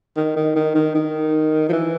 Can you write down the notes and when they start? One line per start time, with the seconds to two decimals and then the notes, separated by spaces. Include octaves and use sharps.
0.16 D#3
0.36 D#3
0.56 D#3
0.75 D#3
0.95 D#3
1.69 F3
1.73 E3